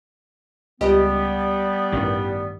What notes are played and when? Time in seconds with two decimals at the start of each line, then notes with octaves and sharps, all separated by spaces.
0.81 C#2 G3 B3 G4 D#5
1.92 A1 G2 D#3